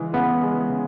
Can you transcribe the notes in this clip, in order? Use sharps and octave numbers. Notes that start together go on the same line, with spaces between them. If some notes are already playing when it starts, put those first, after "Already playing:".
Already playing: C#3 E3 G#3
C#3 B3
G#3
C#3